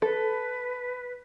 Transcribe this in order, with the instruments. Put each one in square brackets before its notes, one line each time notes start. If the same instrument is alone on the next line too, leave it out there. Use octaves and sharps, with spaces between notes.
[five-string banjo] A4 [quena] B4